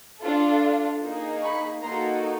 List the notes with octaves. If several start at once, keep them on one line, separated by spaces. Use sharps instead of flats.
D4 F4 A4
A#3 D#4 G#4
B5 C#6
A#3 D#4 F#4 A4 A#5 C6